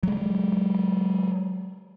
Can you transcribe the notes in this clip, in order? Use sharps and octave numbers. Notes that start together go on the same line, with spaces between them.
F#3 G#3